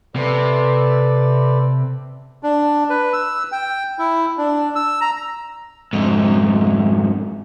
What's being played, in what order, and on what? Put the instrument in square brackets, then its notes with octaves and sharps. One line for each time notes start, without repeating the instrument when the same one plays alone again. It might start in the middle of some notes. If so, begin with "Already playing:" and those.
[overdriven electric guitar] C3 [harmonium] A4 B4 D5
[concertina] D4
B4
E6
G5
E4
D4
E6
A#5
[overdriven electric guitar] F2 G#2